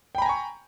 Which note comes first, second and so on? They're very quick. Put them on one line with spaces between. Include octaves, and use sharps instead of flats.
G5 B5 A#5 G#5 C#6